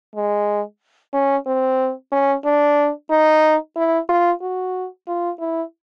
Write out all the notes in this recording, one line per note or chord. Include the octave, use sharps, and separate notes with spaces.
G#3
C#4
C4
C#4
D4
D#4
E4
F4
F#4
F4
E4